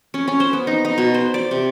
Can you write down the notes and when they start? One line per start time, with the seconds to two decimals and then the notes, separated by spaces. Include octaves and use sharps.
0.14 C#4
0.28 C#4
0.40 C5
0.53 B3
0.67 D#4
0.85 D#4
0.98 B2
1.14 C5
1.34 D5
1.51 C3